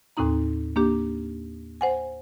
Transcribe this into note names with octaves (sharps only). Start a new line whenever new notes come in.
D#2 A2 C4 D#4 A#5
A#3 D4 G4
C5 F#5 G#5